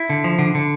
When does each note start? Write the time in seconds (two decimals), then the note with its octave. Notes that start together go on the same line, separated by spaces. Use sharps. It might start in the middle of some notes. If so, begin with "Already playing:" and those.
Already playing: E4
0.10 D3
0.24 F3
0.39 D3
0.55 D3